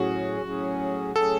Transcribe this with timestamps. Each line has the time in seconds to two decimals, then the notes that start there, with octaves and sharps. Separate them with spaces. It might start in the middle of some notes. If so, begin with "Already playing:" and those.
Already playing: A2 F#3 C#4 F#4 G#4
0.42 A2 F#3 C#4 G#4
1.15 A2 F#3 C#4 G#4 A4